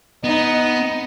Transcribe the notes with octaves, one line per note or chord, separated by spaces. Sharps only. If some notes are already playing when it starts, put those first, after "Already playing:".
B3 D#4